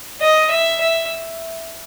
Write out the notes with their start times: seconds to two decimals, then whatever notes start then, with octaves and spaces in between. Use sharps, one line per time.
0.21 D#5
0.51 E5
0.81 E5